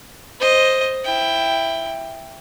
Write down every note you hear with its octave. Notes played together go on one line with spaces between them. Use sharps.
C5 D#5
E4 G5